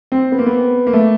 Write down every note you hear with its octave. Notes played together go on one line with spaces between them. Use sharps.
C4
B3
A#3
B3
A#3
A3